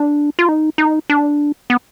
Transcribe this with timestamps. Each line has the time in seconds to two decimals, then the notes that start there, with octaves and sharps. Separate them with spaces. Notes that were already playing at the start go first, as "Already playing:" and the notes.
Already playing: D4
0.39 F4
0.49 D#4
0.78 D#4
1.10 D4
1.70 B3